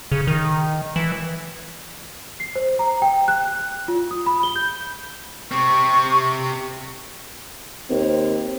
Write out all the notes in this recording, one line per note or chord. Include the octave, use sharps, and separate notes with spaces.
C#3
D#3
E3
C7
C5
A#5
G5
F#6
F#6
F4
D#6
B5
G7
G6
C3 C4 C#6
D#2 C4